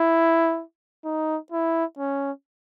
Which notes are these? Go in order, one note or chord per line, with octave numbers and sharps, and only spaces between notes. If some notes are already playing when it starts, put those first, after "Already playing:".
Already playing: E4
D#4
E4
C#4